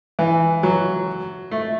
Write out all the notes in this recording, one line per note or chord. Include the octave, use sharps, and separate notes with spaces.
E3
F#3
A3